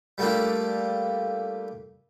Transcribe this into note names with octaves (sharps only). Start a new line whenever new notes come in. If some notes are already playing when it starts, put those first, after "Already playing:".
G3 A3 A#3 D4 F4